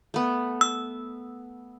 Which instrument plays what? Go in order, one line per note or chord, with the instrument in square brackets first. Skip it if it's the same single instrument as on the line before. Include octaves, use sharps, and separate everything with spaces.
[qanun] A3 B3
[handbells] E6